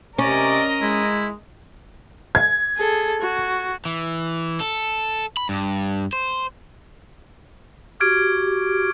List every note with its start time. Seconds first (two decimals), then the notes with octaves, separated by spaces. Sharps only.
0.19 C3 C#4 A#4 D5 D#5
0.81 G#3 E4
2.35 G#6
2.77 G#4 A4
3.21 F#4
3.85 E3
4.60 A4
5.37 B5
5.49 G2
6.13 C5
8.00 F#4 G4 F6 G#6 D7